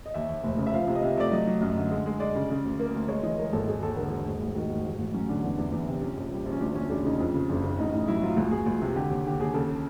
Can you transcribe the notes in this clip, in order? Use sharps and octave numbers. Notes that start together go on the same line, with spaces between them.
D#5
D#2 E5
D#2
F1
C#3
E5
F3 F5
C3
D#5
C3 E5
A3 D5
F#3 D#5
F#3
F#2
D3
G#3
G#3
G#3 D5
C#3
C#3
D2
A#3
D2
G#3 C#5
E3 D#5
G#3 A#4
G#1 A4
E1 G#4
D#2 A4
D3 A#4
E1
G#2
A1
D#3 F#4
G#2
A1
A1
F#3 C#4
D3 D4
E2 D4
E2 D4
E2
C3
A#1 C#4
A#1
G3
A#1
C#4
D2 D4
D2 C#4
E1 D4
C#3 D#4
F2
C#3
F#1 D4
C#3
A1 D#4
A2 D#4
F#3 E4
F#3 F4
C#2 F#4
C#2 G#4
C#2
C3
D3 G4
D#2
D3 G4
D#2 G#4
C#3 A4